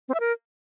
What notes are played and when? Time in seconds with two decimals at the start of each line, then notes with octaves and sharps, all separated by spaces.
0.08 C4
0.14 E5
0.20 A#4